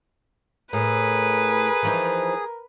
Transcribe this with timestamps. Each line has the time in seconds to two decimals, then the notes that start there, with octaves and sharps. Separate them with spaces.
0.73 A2 G#4 A#4 B4
1.83 E3 F3 D#4